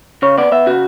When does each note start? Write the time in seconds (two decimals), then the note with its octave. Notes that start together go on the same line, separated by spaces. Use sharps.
0.22 C#3 C#5
0.38 B3 D5
0.52 B3 E5
0.66 C#3 F#4